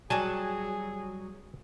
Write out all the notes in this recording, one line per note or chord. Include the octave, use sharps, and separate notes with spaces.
F#3 G3 G#4 G#5 A5